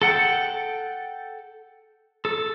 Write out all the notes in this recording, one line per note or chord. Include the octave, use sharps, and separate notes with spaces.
A4 F#5 G5
A4